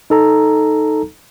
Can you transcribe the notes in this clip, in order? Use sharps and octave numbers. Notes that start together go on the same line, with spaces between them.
D#4 A4 A#5